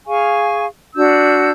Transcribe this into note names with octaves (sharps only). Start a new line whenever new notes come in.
G#4 F5 G#5 C#6
D4 F#4 E6 G6